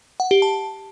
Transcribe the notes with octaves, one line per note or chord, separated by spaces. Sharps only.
F#5
G4
A5